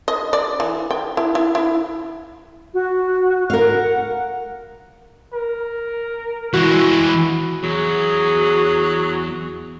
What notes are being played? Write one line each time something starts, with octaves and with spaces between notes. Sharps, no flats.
D#5
D5
E3
G5
E4
E4
E4
F#4
A#4 F5 F#5
A#4
E3 G#3 E4 F#4
E2 F#3 G#4